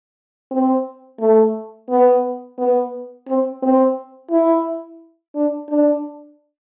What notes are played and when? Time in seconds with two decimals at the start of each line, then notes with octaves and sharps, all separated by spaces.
0.51 C4
1.20 A3
1.90 B3
2.58 B3
3.28 C4
3.63 C4
4.31 E4
5.35 D4
5.70 D4